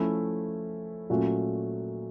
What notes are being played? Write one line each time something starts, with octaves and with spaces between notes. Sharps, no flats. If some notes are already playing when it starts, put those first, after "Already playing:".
Already playing: F3 A3 C#4 E4
A#2 F#3 A3 C#4 F#4